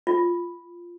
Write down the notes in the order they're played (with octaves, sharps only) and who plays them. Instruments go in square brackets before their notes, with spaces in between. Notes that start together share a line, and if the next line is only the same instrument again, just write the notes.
[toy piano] F4